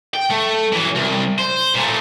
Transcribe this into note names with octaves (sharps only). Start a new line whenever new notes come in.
G5
A3
E3 F#3
C2
C5
A#2 A3